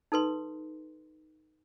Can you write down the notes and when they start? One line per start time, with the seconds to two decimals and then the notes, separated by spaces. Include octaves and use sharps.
0.12 D#4 A4 B4 C6